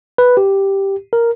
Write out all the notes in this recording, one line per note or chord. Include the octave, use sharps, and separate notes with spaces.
B4
G4
A#4